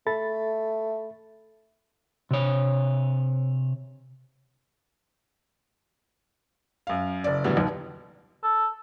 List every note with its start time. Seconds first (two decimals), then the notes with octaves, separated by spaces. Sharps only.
0.07 A3 A4 B5 A6
2.31 C3 C#5
6.87 F#2 F5
7.24 F#1 D5
7.44 A2 D3 E3 F#3 G3 B3
7.57 F1 D#2
8.43 A4